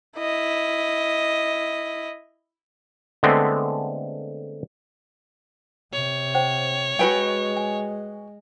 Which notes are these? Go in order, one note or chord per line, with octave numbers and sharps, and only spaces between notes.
E4 D#5
D3 G#3 A3 B3 C4
C3 C#5
C5 F#5 G5
G#3 F#4 A#4 B4 G5 G#5
G#5